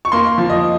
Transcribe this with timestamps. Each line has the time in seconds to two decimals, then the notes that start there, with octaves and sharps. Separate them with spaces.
0.05 C#6
0.12 A#3 C6
0.38 F3
0.50 D#5